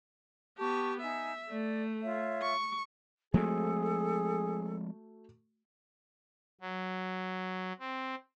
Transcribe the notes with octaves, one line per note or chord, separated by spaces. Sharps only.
B3 G4 A5 C#6
D#4 E5 G#5
A3 D5
F4 C#5 E5
C#6
F3 G#3 A3 C4 F#4 G#4 A4
F#3
C4